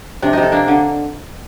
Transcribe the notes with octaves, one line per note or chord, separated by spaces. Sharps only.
C3 D4
C3 D#4
A4
A#3 D4
D3